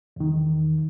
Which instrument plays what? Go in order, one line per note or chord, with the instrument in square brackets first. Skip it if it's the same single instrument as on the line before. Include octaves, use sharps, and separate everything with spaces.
[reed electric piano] E2 D#3